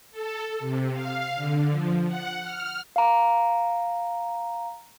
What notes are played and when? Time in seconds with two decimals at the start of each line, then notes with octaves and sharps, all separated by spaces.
0.12 A4
0.60 C3
0.93 F5
1.35 D3
1.70 F3
2.07 F#5
2.43 F6
2.96 F5 A#5